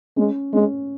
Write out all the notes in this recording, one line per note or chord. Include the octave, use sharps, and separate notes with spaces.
G#3 C#4
G#3 C#4